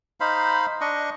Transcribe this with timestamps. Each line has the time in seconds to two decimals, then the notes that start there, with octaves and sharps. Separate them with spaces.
0.20 D#4 C5 F5 B5
0.81 D4 D#5 C#6